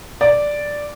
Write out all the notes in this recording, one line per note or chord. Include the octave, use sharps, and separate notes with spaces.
D5